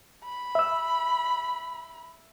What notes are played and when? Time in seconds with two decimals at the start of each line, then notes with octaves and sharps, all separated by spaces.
0.24 B5
0.55 E5 E6